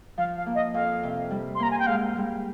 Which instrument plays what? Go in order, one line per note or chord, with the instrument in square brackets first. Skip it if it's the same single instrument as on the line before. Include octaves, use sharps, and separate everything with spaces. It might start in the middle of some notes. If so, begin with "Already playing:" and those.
[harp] F3 [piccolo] F5
[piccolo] F5
[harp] A#3
[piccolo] D#5
[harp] F2 [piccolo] F5
[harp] C3
G3
[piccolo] C6
[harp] A#3 [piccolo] A#5
[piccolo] G#5
G5
[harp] G#2 [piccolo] F5
[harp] G3